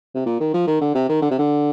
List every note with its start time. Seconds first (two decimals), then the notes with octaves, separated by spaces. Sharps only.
0.15 C3
0.26 A#2
0.40 D#3
0.54 F3
0.67 D#3
0.81 D3
0.95 C3
1.09 D#3
1.22 D3
1.31 C3
1.39 D3